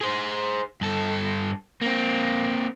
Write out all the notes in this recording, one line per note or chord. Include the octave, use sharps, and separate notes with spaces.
G#4 C5
G2 A4
A#3 C4